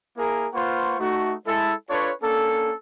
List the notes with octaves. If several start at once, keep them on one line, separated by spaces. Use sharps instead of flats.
A#3 E4 G#4 A#4
A#3 F4 B4 C5 F#5 C#6
A3 D#4 F#4
G#3 E4 A4
D4 F4 A4 B4 C#5
A#3 C#4 D4 A4